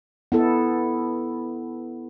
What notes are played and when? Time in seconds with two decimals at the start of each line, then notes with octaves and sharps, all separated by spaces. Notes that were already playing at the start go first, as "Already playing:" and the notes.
0.32 B3 E4 A4